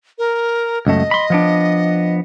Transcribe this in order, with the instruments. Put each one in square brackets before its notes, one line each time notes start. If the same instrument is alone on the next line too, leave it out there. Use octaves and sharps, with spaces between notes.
[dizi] A#4
[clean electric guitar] C#2 F#2 A3 [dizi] D#5
[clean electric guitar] B5 C6
F3 B3 D4